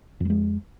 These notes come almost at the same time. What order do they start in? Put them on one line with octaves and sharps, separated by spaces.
F2 G3 G#3